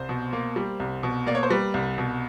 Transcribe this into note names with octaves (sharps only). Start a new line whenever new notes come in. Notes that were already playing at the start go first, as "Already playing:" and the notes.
Already playing: C2 C5
B2
A#3
G3
C2
B2
A#3 D5
C#5
C5
G3 B4
C2
B2